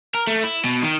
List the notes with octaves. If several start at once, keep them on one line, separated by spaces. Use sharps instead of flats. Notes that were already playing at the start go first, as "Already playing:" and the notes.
A#4
A3
E4
B2
D#3